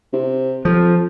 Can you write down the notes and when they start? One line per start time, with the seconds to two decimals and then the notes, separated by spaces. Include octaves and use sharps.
0.13 C3
0.65 F2 F3